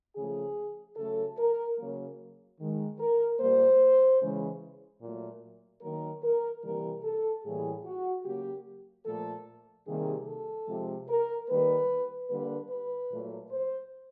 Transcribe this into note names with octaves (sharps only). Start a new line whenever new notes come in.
C#3 F3 A3 G#4
C#3 F#3 A3 A4
A#4
C#3 F#3 A#3
D#3 G#3
A#4
A#2 G3 A#3 C5
C#3 E3 G#3
A#2 F#3 A3
D#3 F#3 A#3 A#4
A#4
C3 E3 G3 A#3 A#4
A4
A2 E3 G3 A#3 G#4
F#4
C#3 F#3 A#3 G4
A#2 F3 A3 A4
C3 D#3 G3 A#3 G#4
A4
C3 F3 G#3
A#4
D#3 G3 A#3 B4
D3 G3 A#3 B4
B4
A#2 F#3 A3
C5